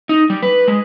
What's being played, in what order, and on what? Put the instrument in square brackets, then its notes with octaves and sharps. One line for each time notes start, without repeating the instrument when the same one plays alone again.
[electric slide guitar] D#4
G3
B4
G#3